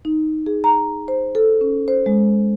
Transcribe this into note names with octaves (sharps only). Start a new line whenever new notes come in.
D#4
G#4
A#5
C5
A4
C#4
C5
G#3